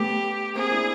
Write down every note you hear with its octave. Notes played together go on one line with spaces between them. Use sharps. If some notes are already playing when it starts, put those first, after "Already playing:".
Already playing: A3 B3 C#4 G4
A#3 C4 G#4
D4 E4